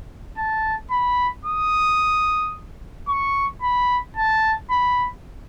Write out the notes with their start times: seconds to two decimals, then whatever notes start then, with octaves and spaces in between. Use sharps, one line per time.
0.37 A5
0.91 B5
1.45 D#6
3.08 C#6
3.62 B5
4.16 A5
4.70 B5